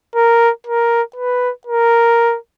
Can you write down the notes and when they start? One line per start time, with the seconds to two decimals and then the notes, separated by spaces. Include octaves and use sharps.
0.16 A#4
0.67 A#4
1.16 B4
1.67 A#4